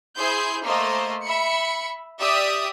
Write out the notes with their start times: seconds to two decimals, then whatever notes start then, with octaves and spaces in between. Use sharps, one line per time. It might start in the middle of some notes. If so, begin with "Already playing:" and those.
0.16 E4 G#4 C5 G6
0.64 A3 A#3 C5 D#5
1.24 E5 B5 C#7
2.19 G4 D5 E5 D#6